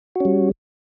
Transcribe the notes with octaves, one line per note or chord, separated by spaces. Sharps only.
G3 C#4 F#4